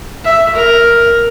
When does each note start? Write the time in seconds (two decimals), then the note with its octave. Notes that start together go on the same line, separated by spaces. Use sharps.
0.24 E5
0.56 A#4